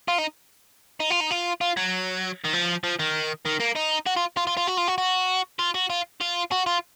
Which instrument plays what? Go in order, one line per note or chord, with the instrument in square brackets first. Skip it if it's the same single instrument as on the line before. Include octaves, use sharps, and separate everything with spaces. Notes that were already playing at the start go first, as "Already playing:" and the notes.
[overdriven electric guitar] F4
D#4
D#4
F4
D#4
F4
F4
F#3
D#3
F3
F3
D#3
D#3
A#3
D#4
F#4
F4
F4
F4
F4
F#4
F4
F#4
F#4
F4
F#4
F4
F4
F#4
F4